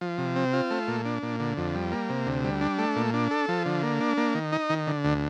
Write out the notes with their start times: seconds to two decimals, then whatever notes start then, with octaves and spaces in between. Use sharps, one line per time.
0.01 F3
0.18 C3
0.36 C4
0.53 F4
0.71 A3
0.88 A#2
1.05 D4
1.23 A#2
1.39 D3
1.57 F2
1.75 G3
1.92 A#3
2.09 C3
2.26 D2
2.44 G3
2.61 D4
2.78 A3
2.96 A#2
3.14 D4
3.31 A4
3.48 F3
3.66 D3
3.83 A#3
4.00 D4
4.17 A#3
4.35 D#3
4.52 D#4
4.69 D#3
4.87 D3
5.04 D2